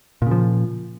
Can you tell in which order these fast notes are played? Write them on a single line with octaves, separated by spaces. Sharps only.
A#2 C#3 F3